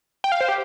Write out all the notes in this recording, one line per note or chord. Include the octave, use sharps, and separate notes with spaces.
G5
F5
C5
G4